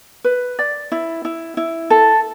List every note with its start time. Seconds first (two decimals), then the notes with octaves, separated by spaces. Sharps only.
0.24 B4
0.59 D5
0.92 E4
1.25 E4
1.57 E4
1.90 A4